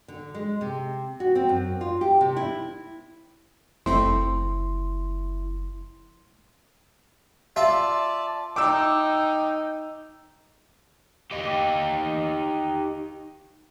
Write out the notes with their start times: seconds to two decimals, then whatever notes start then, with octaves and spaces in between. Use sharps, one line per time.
0.08 D3
0.35 G#3
0.61 C3
1.20 F#4
1.35 C4
1.49 F#2
1.81 F4
2.01 G4
2.21 C3
2.36 E4
3.86 F#1 F2 F3 A3 C4 E4 C6
7.56 F4 D5 E5 A5
8.56 D#4 G5 D6 E6
11.31 D#4 G4